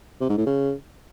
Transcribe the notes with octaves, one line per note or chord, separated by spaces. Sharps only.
C3
G#2
A2
C#3